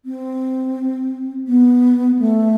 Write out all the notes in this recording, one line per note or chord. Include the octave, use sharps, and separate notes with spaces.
C4
B3
A3